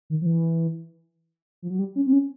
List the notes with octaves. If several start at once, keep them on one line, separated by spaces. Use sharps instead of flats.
D#3
F3
E3
F3
F#3
G3
C#4
C4
C#4